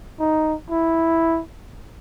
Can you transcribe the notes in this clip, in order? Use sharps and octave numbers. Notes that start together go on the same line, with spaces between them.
D#4
E4